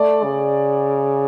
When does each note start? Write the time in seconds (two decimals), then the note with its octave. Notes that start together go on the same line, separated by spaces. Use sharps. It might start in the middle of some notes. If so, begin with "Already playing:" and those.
Already playing: A3 D5
0.23 C#3